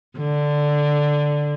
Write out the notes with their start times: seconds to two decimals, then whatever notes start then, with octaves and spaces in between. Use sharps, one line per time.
0.18 D3